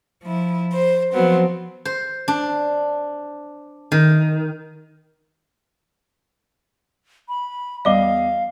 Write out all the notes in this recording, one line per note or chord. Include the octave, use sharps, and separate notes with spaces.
F3 E4
C5
F3 F#3 B3 C4
C5
D4
D#3
B5
E2 G3 D5 D#5 F5 G7